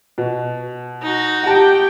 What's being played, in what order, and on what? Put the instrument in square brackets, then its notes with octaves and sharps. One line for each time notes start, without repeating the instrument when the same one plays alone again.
[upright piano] B2
[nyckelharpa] D#4 F#4
[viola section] G4 G5 [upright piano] F#5 A5